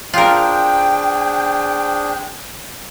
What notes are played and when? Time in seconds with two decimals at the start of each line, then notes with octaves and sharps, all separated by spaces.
0.14 D4 F4 G#4 A#4 C5 G5